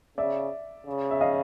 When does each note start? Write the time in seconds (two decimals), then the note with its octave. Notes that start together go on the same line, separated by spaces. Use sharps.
0.18 C#3 D5 E5
0.86 C#3
1.11 E5
1.21 D#5 F5